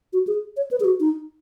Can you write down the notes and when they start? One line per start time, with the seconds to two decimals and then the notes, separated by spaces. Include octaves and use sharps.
0.13 F#4
0.27 G#4
0.57 C#5
0.71 B4
0.80 G#4
0.84 F#4
1.00 D#4